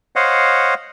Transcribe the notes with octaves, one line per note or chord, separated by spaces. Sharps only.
C5 C#5 D#5 F5 F#5